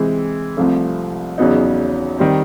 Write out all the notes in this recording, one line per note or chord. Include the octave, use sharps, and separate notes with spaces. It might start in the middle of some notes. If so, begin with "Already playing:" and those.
Already playing: C3 E3 G#3 C4
C2 C3 F3 A3
E2 C#3 F#3 B3 D#4
D#3 G3 C4